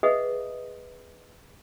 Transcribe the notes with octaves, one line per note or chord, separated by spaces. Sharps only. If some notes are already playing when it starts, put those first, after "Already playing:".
G#4 B4 D#5 E5 F#5 D#6